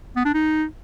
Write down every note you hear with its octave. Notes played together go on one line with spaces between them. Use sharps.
B3
D4
D#4